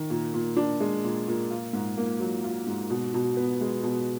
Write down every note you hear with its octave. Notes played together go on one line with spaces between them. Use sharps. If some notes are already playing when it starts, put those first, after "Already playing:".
Already playing: D#3
A#2
A#2
D4
G#3
A#2
A#2
F4
G#2
A#3
F#3
F4
G#2
B2
B2
B3
G#3
B2